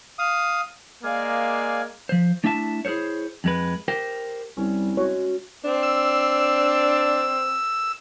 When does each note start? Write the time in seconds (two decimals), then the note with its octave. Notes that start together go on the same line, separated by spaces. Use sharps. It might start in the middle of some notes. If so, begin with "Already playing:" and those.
0.19 F5 D#6
1.04 G#3 A#3 D5 F5 G#5
2.09 F3 C5
2.44 A3 D4 E4 E5 G#5 A5
2.85 E4 G#4 A#4 C5 C#5
3.44 F2 G#3 B4
3.88 G4 A#4 C5 G5
4.57 C2 G3 C#4
4.97 G#3 F#4 C#5
5.64 C4 D4
5.83 E6